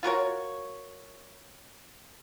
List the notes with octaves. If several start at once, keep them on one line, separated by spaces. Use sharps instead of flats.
F4 F#4 A#4 C#5